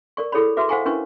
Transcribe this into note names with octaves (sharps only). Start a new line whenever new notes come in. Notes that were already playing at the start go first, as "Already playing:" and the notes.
A#4 D5 C#6
E4 G#4 A4 C#5 D5 B5
F#4 B4 E5 D6
C5 F5 F#5 G#5 A#5 C#6
C#4 D4 E4 A#4 B4 C#6